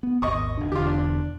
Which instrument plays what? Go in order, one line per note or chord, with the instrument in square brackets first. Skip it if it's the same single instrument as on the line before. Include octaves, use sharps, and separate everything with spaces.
[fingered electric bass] B3
[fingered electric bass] G#1 D#2 [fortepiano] D#5 C#6 D#6
[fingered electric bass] F#1 C2 D4
[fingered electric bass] E1 E2 D3 [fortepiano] F4 G4
[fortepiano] D4